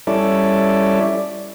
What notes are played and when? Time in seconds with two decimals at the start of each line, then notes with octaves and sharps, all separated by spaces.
0.07 G3 C#4 E4 A4 D5